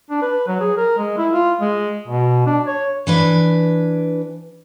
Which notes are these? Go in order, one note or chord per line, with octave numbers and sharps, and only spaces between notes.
D4
B4
F#3
G#4
A#4
G#3
E4
F4
G#3
B2
D4
C#5
E3 D4 B4